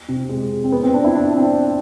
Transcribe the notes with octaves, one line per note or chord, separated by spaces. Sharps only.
C3
G#3
C4
B3
C4
D4
E4
D4
C4